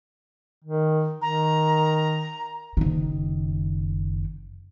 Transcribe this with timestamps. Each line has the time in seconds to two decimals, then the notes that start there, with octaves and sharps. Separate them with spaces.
0.64 D#3
1.22 D#3 A#5
2.77 F#1 D#3